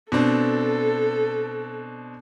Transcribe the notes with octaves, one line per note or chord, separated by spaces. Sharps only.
B2 C4 D4 A4